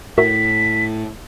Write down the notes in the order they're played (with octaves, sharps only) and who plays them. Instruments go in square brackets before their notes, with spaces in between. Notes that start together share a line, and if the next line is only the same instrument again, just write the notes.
[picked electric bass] A2 [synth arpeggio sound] F#4 A#4 E5 [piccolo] B6